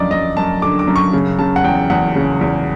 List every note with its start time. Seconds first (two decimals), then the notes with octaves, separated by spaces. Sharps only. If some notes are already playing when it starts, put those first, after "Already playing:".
Already playing: F#2 D3 F3 D5 D#5
0.11 F#2 D#5
0.37 F#2 A5
0.62 D3 D6
0.79 D6
0.87 F#2
0.96 C#6
1.13 C#3
1.39 C#3 A5
1.56 F#5
1.64 E2 G5
1.90 E2 F#5
2.15 C#3
2.41 E2